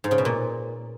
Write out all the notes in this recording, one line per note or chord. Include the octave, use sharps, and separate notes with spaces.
G#2
C#3
B2
A#2